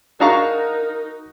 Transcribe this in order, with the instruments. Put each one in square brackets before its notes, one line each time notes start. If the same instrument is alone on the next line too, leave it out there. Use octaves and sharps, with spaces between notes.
[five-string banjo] D4 G#4 F5 [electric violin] D#4 [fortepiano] F#4 A#5 C#6 [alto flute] A#4